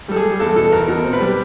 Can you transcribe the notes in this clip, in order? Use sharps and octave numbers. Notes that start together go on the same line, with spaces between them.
G3 A4
G#4
G3
E2 A4
B2 A4
E2 A#4
B2 A#4
C4
B4
G3